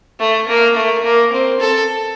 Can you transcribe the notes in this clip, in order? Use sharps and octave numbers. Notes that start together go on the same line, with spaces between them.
A3
A#3
A3
A#3
C4
A4